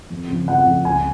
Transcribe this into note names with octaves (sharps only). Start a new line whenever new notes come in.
F2
C#3 F3
F2 F#5
C#3 F3
C#2 G#5